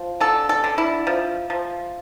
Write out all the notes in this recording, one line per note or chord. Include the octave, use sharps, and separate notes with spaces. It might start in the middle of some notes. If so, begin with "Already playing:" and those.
Already playing: F3
D3 A4
A4
D3
E4
F3
F3